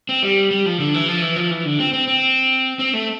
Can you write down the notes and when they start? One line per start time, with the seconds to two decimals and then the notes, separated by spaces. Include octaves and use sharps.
0.09 C4
0.23 G3
0.51 G3
0.66 F3
0.80 D3
0.94 E3
1.08 F3
1.22 E3
1.36 F3
1.51 E3
1.65 D3
1.80 C4
1.93 C4
2.07 C4
2.79 C4
2.93 A3